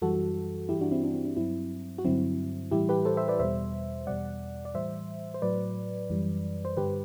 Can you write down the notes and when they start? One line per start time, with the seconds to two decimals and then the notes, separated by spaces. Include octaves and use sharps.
0.02 F#2 E3 G3 F#4 A4
0.69 G2 E3 G3 E4 G4
0.81 D4 F#4
0.91 C4 E4
1.04 D4
1.14 C4
1.25 D4
1.37 G2 F#3 C4 E4
1.98 F#4
2.04 G2 D3 F#3 C4 E4
2.71 A2 E3 G3 E4 G4
2.89 G4 B4
3.05 A4 C5
3.17 C5 E5
3.28 B4 D5
3.39 E2 B2 G3 C5 E5
4.07 E2 B2 G3 D5 F#5
4.65 D5
4.74 A2 E3 G3 C5 E5
5.34 C5
5.42 A2 F#3 B4 D5
6.10 F#2 E3 G3
6.65 C5
6.77 G2 D3 G3 G4 B4